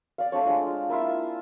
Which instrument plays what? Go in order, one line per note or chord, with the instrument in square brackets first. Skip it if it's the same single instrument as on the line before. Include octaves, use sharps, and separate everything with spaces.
[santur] D5 F5
A3 C4 D4 C#5
G#3 D4 F4
F4
A#3 E4 F4 E5